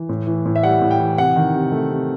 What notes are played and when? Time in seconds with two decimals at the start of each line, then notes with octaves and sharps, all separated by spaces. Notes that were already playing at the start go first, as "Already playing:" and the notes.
Already playing: E3
0.09 A2
0.27 E3
0.45 A2
0.56 E5
0.63 G3 F#5
0.82 A2
0.91 G5
1.00 E3
1.18 C3 F#5
1.36 D#3
1.54 C3
1.72 A3
1.91 C3